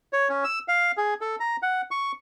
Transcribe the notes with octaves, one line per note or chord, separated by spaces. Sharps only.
C#5
C#4
E6
F5
G#4
A4
A#5
F#5
C#6